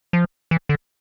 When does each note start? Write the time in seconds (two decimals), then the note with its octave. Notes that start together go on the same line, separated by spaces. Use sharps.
0.13 F3
0.51 E3
0.69 D3